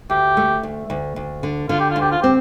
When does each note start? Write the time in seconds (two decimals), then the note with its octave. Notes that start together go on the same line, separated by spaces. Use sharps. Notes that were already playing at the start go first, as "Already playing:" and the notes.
0.10 D2 G4
0.37 A3
0.63 D2
0.90 D2
1.16 D2
1.43 D3
1.69 D3 F4
1.80 G4
1.91 F4
1.96 D2
2.01 G4
2.11 F4
2.21 C4 G4